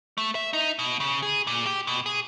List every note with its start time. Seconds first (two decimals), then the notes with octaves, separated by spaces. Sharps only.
0.18 A3
0.35 E5
0.53 D#4
0.79 B2
1.00 C#3
1.23 G#4
1.47 A#2
1.66 G4
1.87 B2
2.06 G#4